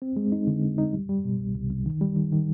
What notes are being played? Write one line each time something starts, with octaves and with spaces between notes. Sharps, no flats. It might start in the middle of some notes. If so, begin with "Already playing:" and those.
C4
G#3
D#4
D3
D3
D#4
G3
G3
B2
C2
C2
C2
D#3
G3
D#3
D#3